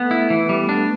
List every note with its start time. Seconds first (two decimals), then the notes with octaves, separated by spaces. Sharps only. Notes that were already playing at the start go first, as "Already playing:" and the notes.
Already playing: A3 B3
0.11 E4
0.30 E3 B3
0.49 G3
0.69 D4